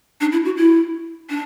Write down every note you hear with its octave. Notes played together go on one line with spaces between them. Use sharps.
D4
E4
F#4
E4
D4